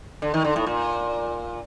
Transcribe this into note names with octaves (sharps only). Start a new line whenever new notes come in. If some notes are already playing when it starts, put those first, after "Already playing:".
D3
D#3
D3
A2
A#2